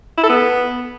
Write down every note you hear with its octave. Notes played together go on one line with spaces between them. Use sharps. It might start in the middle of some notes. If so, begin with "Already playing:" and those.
E4
A4
B3